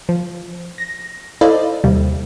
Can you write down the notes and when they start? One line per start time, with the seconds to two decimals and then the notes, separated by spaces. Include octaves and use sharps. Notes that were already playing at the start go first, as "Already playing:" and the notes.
0.09 F3
0.78 A#6
1.41 E4 A4 C5 D5 D#5 F5
1.84 D#2 C3 G3